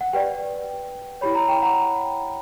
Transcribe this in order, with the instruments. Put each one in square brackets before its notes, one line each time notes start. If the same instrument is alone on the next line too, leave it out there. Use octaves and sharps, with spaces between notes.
[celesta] F#5
G4 B4 D5 G5
E4 G4 C#5 B5
A#5
G5
F#5 A#5